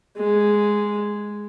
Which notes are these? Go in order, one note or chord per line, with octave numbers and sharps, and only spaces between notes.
G#3